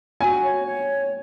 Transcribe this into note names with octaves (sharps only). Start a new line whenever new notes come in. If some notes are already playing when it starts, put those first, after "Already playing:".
F#4 G#5
C#5
C#5